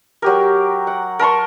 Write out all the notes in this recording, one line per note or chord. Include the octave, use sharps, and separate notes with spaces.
F#3 G4 A#4
F#5
A#4 A5 C6 C#6